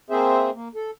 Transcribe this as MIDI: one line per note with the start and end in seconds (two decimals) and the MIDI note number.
0.10 0.50 58
0.10 0.50 60
0.10 0.50 68
0.10 0.50 72
0.10 0.50 76
0.54 0.68 58
0.75 0.91 69